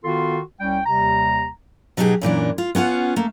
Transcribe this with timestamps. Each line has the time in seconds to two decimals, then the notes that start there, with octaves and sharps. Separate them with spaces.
0.04 D#3 B3 F4 F#4 A4 C6
0.60 C2 G3 C#4 G5
0.86 D#2 C3 G3 A#5
1.97 B2 F#3 D#4 F4 G4 G#4
2.21 F#2 A#2 E3 D4
2.58 F4
2.75 B3 C#4 F4 F#5
3.16 A3 A#3